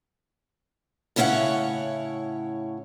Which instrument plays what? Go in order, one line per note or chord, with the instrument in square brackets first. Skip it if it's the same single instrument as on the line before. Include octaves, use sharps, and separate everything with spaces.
[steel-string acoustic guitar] A2 C#3 C#4 E4 C#5 F#5